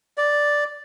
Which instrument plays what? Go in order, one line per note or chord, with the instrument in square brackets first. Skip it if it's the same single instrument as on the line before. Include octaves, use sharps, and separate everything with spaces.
[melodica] D5